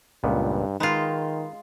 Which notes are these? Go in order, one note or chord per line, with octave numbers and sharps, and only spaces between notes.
C#2 G2 A#2 B3
D#3 G#3 D#4 F4 B4